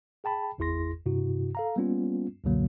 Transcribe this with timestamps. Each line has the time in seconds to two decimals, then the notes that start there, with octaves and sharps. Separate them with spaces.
0.24 G#4 G5 A5 B5
0.58 G#1 E2 E4 G#4 C6 A#6
1.06 G2 C3 E4 F#4
1.55 A4 F5 A#5
1.76 G3 A#3 B3 C#4 F4
2.44 C#2 F#2 B2 D3 F#3 A#3